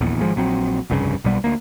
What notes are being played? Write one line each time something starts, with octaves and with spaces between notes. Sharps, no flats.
D#1 A#1 E2
G#1 F3 G#3
A#1 F#3 C4
F1 C2 G2 C#3
B1 B2 G3 B3
D2 A#3